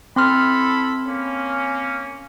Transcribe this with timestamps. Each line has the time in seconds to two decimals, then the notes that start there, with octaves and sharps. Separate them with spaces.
0.16 C4 E4 A4 B5 C6 F6
1.06 A#3 C#4